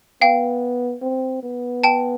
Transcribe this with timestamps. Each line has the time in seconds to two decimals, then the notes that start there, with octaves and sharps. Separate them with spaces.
0.21 B3 F5 G5
1.02 C4
1.43 B3
1.84 G5 A5